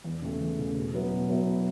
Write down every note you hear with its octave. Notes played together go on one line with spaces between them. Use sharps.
E2
C#3 A3
E2
C#3 A3
B2
F#3 B3 E4
B2
F#3 B3 E4